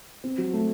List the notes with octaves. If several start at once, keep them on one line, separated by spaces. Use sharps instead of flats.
C4
F#3
A3